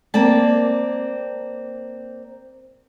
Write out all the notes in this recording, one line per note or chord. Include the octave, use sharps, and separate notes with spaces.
A#3 C4 D5 A5